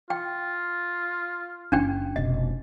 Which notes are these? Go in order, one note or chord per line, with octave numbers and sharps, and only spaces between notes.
F4 G5
F#1 C#4 D4 G5
F1 B2 D#5